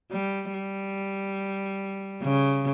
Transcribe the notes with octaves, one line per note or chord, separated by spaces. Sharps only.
G3
G3
C#3